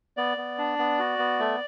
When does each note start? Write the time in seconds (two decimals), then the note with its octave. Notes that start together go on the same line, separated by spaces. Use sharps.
0.17 B3 D5
0.37 B3
0.58 D4
0.79 B3
0.99 F#4
1.19 B3
1.39 A3